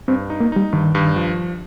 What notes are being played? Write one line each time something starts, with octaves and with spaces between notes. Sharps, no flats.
G2 C4
D#4
A#3
G3 D#4
G2 D#3
G2
F3